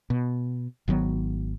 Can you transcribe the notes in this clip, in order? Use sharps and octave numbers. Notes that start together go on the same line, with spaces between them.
B2
G#1 D#3 F#3 B3